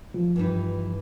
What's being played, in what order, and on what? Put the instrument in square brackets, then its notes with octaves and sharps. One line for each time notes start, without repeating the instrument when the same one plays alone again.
[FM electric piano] F3
[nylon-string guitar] G2 E3 D#4